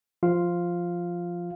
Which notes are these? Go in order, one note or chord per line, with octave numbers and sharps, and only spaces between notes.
F3 F4 F5